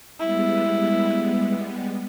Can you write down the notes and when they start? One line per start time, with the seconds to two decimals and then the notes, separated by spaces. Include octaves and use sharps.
0.20 G3 G#3 B3 E4